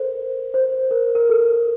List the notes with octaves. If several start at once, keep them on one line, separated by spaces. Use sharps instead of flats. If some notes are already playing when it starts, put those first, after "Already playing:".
Already playing: A4 A#4 C5
C5
A#4
A#4
A4